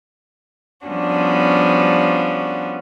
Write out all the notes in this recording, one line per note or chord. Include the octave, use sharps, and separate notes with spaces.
F3 G3 B3 C#4 D4 F#4